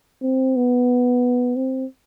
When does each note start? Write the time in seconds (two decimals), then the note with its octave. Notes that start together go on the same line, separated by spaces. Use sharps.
0.22 C4
0.56 B3
1.56 C4